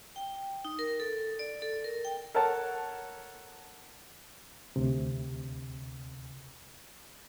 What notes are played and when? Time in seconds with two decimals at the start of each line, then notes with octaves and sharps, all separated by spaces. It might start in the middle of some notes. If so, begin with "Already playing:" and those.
0.16 G5
0.65 D#4
0.79 A#4
1.00 A4
1.39 D5
1.62 A4
1.84 A#4
2.05 G5
2.35 A4 A#4 C#5 F#5 A5
4.76 D2 C3